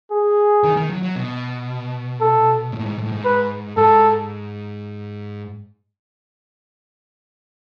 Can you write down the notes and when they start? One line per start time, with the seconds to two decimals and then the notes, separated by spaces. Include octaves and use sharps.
0.11 G#4
0.64 D#3
0.77 D#3
0.90 F#3
1.03 F#3
1.16 B2
2.20 A4
2.72 A2
2.86 G#2
2.98 A2
3.12 G#2
3.25 B4
3.77 G#2 A4